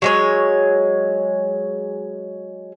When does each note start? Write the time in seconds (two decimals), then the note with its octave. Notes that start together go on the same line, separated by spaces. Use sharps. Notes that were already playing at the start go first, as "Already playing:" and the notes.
0.02 F#3 G#3 C#5